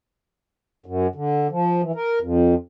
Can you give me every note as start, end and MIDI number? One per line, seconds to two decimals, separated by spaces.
0.86 1.07 42
1.15 1.47 50
1.51 1.82 53
1.83 1.92 52
1.95 2.19 70
2.22 2.55 41